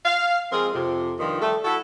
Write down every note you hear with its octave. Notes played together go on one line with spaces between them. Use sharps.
F5
F3 G#3 C4 F4 G#4 A#4
F2 C3
G2 D#3 F3
G3 A3 A4
E4 F#4 A4